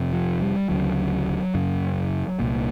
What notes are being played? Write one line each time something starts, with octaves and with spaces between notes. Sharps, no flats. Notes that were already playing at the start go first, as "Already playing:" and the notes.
Already playing: F2 C3
F3
G3
D2 C#3 F#3
F#2 C#3
C2 A#2